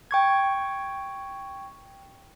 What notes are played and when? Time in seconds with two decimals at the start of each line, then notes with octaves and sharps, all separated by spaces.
0.11 G5 C#6 G#6